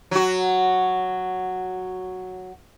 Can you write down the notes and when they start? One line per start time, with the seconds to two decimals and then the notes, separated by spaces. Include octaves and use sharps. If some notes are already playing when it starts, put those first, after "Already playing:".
0.11 F#3 F#4